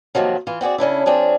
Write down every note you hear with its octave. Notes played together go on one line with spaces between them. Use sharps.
D#2 G#2 C3 D#3 F3 F#3
E3 F4
C4 F#4 G#4 D5
C#3 C#4 D4 E4
F3 C4 D4 G#4 C#5